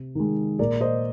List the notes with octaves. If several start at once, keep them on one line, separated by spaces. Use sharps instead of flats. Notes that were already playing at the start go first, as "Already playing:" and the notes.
Already playing: C3
D#3 G#3
A#2 A#4 D5
C5 D#5